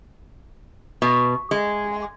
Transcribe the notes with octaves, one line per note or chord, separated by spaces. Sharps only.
B2
G#3